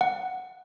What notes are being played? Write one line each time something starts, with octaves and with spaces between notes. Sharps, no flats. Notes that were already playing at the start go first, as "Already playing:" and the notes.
F#5